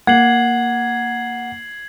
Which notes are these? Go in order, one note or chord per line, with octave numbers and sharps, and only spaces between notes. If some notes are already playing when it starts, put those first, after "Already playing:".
A#3 F#5 G#6 C7 F#7